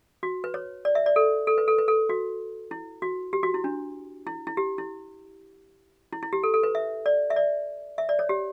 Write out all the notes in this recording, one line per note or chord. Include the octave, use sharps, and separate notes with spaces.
F#4
B4
C#5
D5
E5
D5
A4
A4
B4
A4
B4
A4
F#4
E4
F#4
G4
F#4
E4
D4
E4
E4
G4
E4
E4
E4
G4
A4
A4
B4
E5
D5
E5
D5
E5
D5
C#5
G4